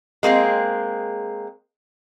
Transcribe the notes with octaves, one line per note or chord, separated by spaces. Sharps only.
G#3 A#3 C4 G#4